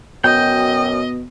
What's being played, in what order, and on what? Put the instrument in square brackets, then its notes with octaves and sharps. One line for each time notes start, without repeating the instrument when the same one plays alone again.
[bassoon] F#2 [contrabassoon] B2 [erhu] D#5 [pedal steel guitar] G5